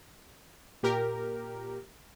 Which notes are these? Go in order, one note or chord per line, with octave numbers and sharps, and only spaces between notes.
A#2 G4 A#4